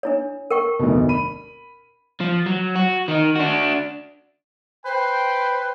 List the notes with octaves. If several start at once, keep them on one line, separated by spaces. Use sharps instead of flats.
D4 E4 C#5
A#4 G5 C#6
F1 D2 B2
B5 D#7
F3
F#3
F#4
D#3 D#4
D4 F#4
B4 C5 G5